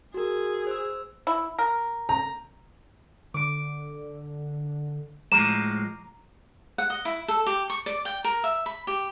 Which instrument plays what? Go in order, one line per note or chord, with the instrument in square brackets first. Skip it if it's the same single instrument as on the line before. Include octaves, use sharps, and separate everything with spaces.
[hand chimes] F#4 A#4 [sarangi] G#4
[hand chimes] C5 E6
[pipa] E4
A#4
[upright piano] A#5
[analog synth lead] D3 [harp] D6 D7
[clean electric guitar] A2 F3 G#3 [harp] A#5 D6 D#7 [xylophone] E7
[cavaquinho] F#5
D#5
E4
A4
G4
C#6
D5
G5
A#4
E5
B5
G4